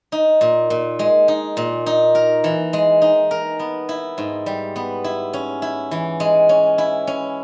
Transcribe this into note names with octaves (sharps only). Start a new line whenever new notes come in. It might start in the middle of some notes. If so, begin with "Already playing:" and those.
D#4
A#2
A#2
G#3
D#4
A#2
D#4
A#4
E3
G#3
D#4
A#4
B3
E4
G#2
G3
B3
E4
C#4
E4
E3
G#3
C#4
E4
C#4